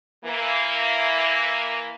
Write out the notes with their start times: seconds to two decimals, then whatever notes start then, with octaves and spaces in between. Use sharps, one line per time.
0.25 E3 A#3